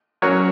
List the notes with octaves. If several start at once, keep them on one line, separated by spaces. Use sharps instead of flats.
F#3 C#4 F#4 A#4 C#5